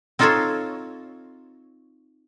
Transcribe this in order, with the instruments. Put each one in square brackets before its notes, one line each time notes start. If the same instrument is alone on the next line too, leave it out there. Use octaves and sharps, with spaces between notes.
[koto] C4 D#4 F4 A4 C5 C#5